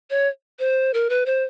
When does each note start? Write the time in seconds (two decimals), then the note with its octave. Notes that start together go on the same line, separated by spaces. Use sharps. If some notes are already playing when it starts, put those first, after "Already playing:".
0.10 C#5
0.59 C5
0.94 A#4
1.10 B4
1.26 C5